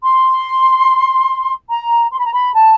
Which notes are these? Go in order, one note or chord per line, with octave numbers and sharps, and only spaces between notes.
C6
A#5
C6
B5
A#5
B5
A5